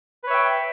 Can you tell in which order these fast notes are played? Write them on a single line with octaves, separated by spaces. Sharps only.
B4 C#5 E5 G5